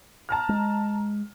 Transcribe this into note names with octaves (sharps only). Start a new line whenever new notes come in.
A5 A#5 F6
G#3